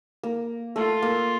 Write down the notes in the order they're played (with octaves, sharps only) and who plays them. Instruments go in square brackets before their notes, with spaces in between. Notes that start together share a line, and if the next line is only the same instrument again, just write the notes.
[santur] A#3
[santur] A3 [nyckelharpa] F4
[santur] A#3